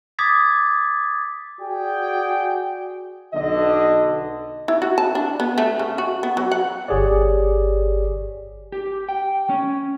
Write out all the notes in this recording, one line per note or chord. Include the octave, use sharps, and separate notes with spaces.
D6 D#6 G#6 A6 B6
F#4 G#4 D5 G5
B1 D3 D#5
E4
F#4
A5
D4
B3
A3
C#3
F#4
B3
F#3
F#5
G1 G4 G#4 C#5 D5
G4
G5
C#4